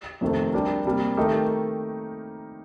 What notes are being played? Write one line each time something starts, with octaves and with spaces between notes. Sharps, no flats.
F2 C3 D#3 A3
G3 D4 G4 A#4
C3 G3 A#3
D#3 A3 D#4 G4 A#4